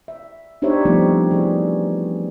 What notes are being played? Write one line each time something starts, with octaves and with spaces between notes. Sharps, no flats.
E5
D4 D#4 G4 C5 C#5 E5
F3 G3 A3 B3 C4 D#4
E3 G#4